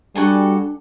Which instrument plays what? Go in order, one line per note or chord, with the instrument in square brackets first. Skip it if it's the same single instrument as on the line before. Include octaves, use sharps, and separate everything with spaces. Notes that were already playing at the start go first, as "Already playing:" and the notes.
[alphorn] G3 [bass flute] D4 [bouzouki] F#4 A4 G#5